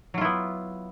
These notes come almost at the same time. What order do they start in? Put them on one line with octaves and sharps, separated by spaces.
F#3 F4 E4 B3